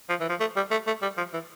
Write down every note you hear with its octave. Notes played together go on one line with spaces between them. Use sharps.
F3
E3
F3
A3
G3
A3
A3
G3
F3
E3